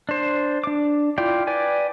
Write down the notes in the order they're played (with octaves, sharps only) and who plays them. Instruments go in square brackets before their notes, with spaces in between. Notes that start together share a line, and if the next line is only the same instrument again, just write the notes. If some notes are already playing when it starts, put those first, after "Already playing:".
[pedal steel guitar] D4 C5
D4 D6
E4 F4 D5 G5
B4 D5 G5 G#5